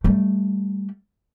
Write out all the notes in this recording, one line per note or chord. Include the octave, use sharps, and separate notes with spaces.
G3 A3